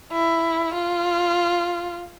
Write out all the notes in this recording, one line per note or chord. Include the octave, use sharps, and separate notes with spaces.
E4
F4